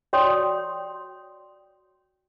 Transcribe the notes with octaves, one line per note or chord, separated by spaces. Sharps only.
F#4 C#5 D5 G5 C6 D#6